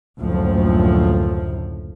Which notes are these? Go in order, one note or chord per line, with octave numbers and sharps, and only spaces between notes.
F#1 D2 A2 F3